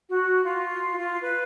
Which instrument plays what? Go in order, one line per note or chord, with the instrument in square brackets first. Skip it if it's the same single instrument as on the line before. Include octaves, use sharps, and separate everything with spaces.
[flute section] F#4
F4
F4
B4